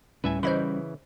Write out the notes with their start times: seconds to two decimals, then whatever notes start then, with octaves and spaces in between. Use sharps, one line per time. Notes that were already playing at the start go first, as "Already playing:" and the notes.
0.24 D2 A2 G3 C#4 B4 E5 G#5
0.43 C#3 E3 E4 C5 D#5 B5